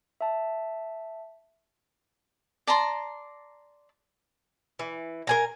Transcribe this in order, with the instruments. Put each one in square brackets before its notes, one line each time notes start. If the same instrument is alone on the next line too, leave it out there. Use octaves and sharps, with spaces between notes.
[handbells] E5 A5
[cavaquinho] D5 A5 A#5 C6
[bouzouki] E3
A#4 G#5 A#5